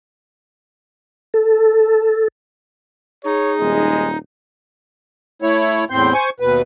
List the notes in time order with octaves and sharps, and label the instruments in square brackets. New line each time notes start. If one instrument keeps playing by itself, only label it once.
[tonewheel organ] A4
[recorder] D#4 [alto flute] G#4 [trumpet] C#5
[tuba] D#1 [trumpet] G#3
[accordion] A3 E4 C#5
E2 A2 C4 C6 G6
C5 G#5 C#6
D#2 B2 B4